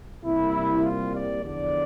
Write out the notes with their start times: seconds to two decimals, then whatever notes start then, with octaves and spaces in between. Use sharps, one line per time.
0.24 C2 C3 G3 A#3 E4
0.83 F4
1.14 D5
1.44 E2 D3 F3 D5